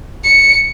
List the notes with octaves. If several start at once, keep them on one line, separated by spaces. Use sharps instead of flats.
C#7